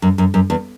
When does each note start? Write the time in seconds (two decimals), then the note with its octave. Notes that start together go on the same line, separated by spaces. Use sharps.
0.02 F#2
0.18 F#2
0.34 F#2
0.50 E2